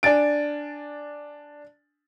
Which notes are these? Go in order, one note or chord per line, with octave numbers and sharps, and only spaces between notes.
D4 G#5 A6 D7